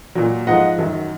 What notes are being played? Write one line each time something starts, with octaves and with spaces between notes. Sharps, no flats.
A#2 F#3
G#2 F3 D#5 F#5
F#2 D#3 F#3